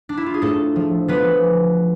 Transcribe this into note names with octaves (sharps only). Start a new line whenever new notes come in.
D4
E4
F4
G#4
A2 A3 A4
F3
F3 B3 B4